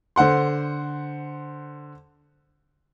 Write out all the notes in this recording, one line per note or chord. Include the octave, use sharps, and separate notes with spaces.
D3 C5 F#5 C6